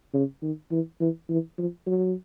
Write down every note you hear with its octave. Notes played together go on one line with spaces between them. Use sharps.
C#3
D#3
E3
E3
E3
F3
F#3